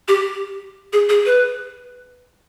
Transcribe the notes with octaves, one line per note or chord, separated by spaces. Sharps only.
G4
G#4
G#4
B4